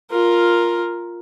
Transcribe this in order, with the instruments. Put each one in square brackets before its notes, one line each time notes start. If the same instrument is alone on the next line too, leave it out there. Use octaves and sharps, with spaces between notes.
[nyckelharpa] F4 A#4